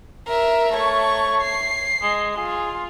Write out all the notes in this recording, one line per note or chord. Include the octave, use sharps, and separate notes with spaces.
A#4 E5
A3 C#5 C#6
C7
G#3
F4 G#4